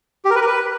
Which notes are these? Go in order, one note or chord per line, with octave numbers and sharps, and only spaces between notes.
G4
A#4
B4
A#4
B4